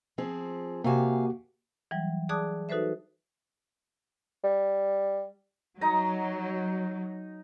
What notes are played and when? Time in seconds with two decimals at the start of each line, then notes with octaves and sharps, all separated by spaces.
0.18 F3 C4 G#4
0.84 C3 A#3 F#4 G4 F5 G#5
1.91 E3 F#3 G3
2.29 G#4 D5 A5 D6 D#6 F#6
2.69 D#4 F#4 A4 B4 C5 E5
4.44 G3
5.81 F#3 D#4 D#5 A#5